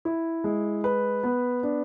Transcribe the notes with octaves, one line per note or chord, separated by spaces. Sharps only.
E4
G#3
B4
B3
D4